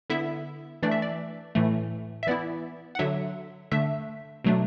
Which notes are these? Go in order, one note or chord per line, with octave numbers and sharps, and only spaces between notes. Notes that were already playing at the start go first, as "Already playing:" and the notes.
D3 B3 E4 E5
E3 A3 D4 D5
E5
D5
A2 E3 A3
E5
E3 B3 E4 D5
F#5
D3 F#3 D4 E5
D3 A3 D4 E5
B2 F#3 A3 D4